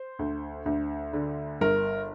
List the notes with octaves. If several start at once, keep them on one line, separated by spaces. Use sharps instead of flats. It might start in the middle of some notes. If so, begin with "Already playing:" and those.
Already playing: C5
D2
D2
D3
G1 A#4